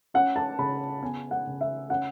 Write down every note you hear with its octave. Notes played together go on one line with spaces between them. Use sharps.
C#4 F#5
A5
C#3 B5
B3 G#5
F#5
C#3
E5
C#4 F#5